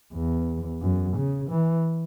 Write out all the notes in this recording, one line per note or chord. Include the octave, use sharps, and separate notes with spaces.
E2
F#2
C#3
E3